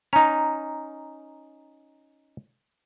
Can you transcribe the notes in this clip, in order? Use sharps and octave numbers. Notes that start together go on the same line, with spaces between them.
C#4 D#4 A#5